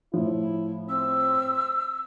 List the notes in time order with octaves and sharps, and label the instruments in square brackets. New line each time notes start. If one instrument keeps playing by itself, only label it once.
[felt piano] A2 F3 [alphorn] E4
[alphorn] C4 [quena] E6